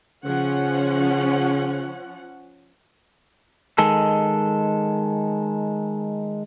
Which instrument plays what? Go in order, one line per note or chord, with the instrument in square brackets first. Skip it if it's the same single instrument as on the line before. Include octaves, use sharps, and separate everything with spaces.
[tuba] C#3 [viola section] F3 C#4 F#5
[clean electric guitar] D#3 G#3 A4